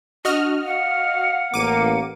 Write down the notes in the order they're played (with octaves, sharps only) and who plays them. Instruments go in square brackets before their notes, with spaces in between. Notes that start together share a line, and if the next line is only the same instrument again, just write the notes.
[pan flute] D4 [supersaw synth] F#4 D#5 F6
[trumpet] F5 [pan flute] F#5
[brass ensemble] A1 A#3 [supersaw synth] D6 D#7